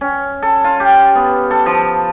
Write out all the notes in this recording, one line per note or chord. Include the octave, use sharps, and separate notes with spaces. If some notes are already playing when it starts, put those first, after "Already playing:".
C#4
A4
F4
G4
B3
A4
F3